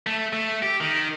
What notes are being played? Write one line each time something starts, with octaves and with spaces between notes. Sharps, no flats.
A3
A3
G4
D#3